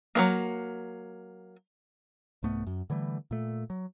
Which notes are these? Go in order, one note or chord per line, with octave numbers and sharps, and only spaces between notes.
F#3 G#3 A#3
C2 G#2 A3 B3
F#2
D3 E3 G3 A3
A#2 A3
F#3